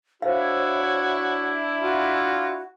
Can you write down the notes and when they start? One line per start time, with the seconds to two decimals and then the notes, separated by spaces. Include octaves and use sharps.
0.22 D4 E4 F#4 C5 C#5 F5
1.81 F4 F#4